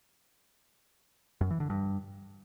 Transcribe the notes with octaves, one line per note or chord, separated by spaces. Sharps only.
F#2
E3
D3
G2